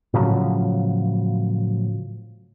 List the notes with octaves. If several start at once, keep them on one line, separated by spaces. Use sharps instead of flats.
A2 C#3 F3 F#3